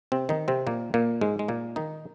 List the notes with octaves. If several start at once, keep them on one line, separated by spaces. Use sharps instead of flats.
C3 C4
D#3 D#4
C3 C4
A#2 A#3
A#2 A#3
G#2 G#3
G#3
A#2 A#3
D#3 D#4